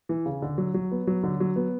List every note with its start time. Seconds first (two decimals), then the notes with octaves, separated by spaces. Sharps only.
0.09 E3
0.26 C#3
0.42 D3
0.58 F#3
0.74 F#3
0.91 B3
1.07 F#3
1.23 D3
1.40 F#3
1.56 B3